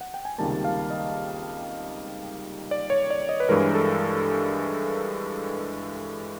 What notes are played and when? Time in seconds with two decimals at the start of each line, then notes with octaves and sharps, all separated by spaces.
0.01 F#5
0.14 G5
0.25 G#5
0.38 C#2 C3 D#3 G3 A#3 A5
0.65 F5
0.90 D#5
2.71 D5
2.90 C#5
3.10 D5
3.29 D#5
3.40 B4
3.49 G2 E3 G#3 A#4
3.74 A4